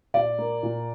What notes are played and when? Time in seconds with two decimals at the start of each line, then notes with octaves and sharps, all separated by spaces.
0.14 A#2 D5
0.38 A#3
0.63 A#2